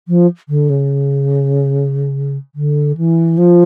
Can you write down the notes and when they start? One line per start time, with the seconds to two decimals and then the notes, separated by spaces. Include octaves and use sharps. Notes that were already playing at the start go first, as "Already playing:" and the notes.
0.07 F3
0.48 D3
0.69 C#3
2.54 D3
2.97 E3
3.37 F3